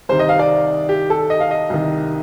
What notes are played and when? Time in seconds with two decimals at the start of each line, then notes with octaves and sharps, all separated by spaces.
0.09 C2 C3 D#3 C5
0.19 D#5
0.29 F5
0.39 D5
0.89 G4
1.10 A4
1.30 D#5
1.40 F5
1.51 D#5
1.70 C2 C3 D#3